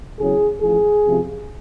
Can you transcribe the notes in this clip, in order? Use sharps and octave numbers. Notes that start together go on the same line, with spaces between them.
E2 C#3 F#3 G#4
A1 A2 F3 G#4
C#2 C3 F3